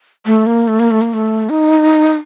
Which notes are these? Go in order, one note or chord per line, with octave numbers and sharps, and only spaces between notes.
A3
A#3
A3
A#3
A3
A#3
A3
D#4